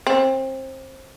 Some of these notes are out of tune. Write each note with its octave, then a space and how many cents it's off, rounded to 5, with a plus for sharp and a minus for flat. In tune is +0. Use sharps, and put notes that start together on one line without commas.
C4 +25